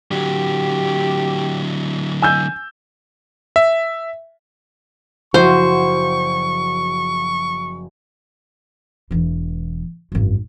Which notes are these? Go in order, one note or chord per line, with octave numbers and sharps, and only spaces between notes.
D3 F#3 G4
G#5 E6 G6
E5
F#1 F3 E4 F#4 C5 C#6 D#7
E1 E3
G#1 F#2